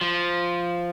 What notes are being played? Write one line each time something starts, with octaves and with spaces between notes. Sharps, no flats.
F3